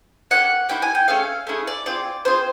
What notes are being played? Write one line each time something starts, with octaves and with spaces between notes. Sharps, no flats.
A#3 C#4 G4 F#5
A#3 C#4 E4 G4 G5
G#5
G5
A3 C#4 G#4 F5
A3 C#4 E4 G#4
D5
C4 F4 G#4 D5
C4 F4 G#4 C5